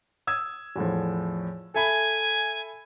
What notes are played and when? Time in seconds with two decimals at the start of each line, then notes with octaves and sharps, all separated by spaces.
0.27 D#6 E6 G#6
0.76 E2 A2 F3
1.74 A4 E5 G#5 B5